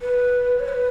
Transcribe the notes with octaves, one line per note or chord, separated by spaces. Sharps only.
B4
C#5
B4